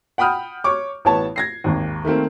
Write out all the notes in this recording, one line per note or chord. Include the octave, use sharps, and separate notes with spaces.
F#5 G5 B5 D#6 F6 G6
C#5 C#6 D6
A1 B3 C#5 A5
G#6 A#6 C7
G#1 D#2
D#3 A3 A#3 C4